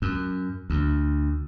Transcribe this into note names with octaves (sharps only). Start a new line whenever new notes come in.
F#2
D2